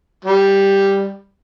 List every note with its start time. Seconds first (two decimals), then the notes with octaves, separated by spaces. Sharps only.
0.25 G3